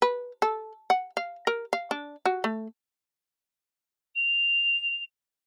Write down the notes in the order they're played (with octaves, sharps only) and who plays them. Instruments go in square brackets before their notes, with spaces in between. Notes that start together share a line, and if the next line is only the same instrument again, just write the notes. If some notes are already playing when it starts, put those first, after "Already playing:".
[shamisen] B4
A4
F#5
F5
A#4
F5
D4
F#4
A3
[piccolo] F7